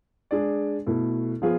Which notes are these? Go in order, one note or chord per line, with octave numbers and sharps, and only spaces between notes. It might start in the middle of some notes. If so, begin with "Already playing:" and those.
G#3 D4 G#4 D5
B2 A3 E4 A4
F3 B3 F4 G#4